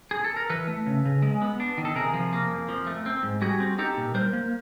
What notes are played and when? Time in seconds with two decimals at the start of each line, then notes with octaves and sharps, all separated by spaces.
0.11 G#4
0.24 A4
0.36 A#4
0.50 E3 A4 B4
0.68 A3
0.86 C#3
1.05 C#3
1.22 G#3
1.42 B3
1.60 D4
1.77 D#3
1.85 A4
1.95 C3 G#4 A#4
2.14 F3
2.33 A#3
2.50 F2
2.68 F3
2.87 A3
3.06 C4
3.23 G#2
3.41 G3 F#4 G#4
3.60 C4
3.78 D#4 G4 A4
3.97 A#2
4.14 G3 A#4 C5
4.33 A#3